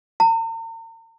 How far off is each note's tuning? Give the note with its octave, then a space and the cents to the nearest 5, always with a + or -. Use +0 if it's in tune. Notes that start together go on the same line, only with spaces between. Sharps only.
A#5 -45